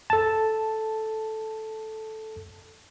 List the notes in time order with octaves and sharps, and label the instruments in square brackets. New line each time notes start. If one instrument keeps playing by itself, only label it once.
[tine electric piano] A4 A5